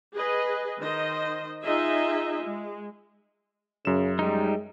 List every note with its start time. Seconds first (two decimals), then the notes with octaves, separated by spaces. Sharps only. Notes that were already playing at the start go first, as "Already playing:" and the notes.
0.15 G#4 B4 D#5
0.79 D#3 C5 D#5
1.62 D#4 F4 G#4 D#5 E5
2.41 G#3
3.85 F#2 C#3 E7
4.19 G3 G#3 D#4